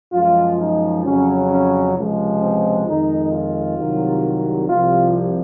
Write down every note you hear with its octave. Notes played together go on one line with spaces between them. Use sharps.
F#2 F3 G#3 F4
D#4
F2 C#3 F#3 C#4
C#4
C#2 C3 F3 G#3
C4
F2 D#3 G#3 D#4
F4
C2 C3 D#3 F#3
C2 C3 F3 F4